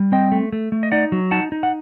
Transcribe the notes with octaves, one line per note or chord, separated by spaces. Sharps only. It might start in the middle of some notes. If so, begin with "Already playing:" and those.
Already playing: G3
C4 D#5 G5
A3
A3
A3
D#5
D#4 D5 F#5
F#3
D#4 F#5 A5
D#4
F#5